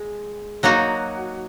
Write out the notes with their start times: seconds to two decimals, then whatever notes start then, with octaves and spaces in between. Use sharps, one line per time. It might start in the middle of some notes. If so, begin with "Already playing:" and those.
Already playing: G#3
0.63 F#3 A#3 D#4 F#4